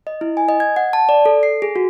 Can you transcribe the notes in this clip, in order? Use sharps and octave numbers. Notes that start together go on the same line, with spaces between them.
D#5
E4
G#5
D#5
G#6
F#5
A5
D5
A4
C7
G#4
F#4